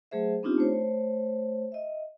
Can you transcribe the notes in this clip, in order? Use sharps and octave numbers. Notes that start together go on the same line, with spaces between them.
F#3 A3 G#4 C5 E5
B3 C4 D4 D#4 F4 G4
A3 C5 C#5
D#5 E5